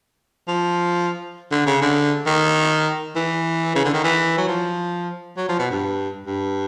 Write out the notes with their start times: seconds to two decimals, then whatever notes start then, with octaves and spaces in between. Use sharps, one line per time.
0.48 F3
1.51 D3
1.66 C#3
1.81 D3
2.26 D#3
3.15 E3
3.75 C#3
3.85 D3
3.94 D#3
4.04 E3
4.38 F#3
4.47 F3
5.37 F#3
5.48 F3
5.59 B2
5.71 G2
6.26 G2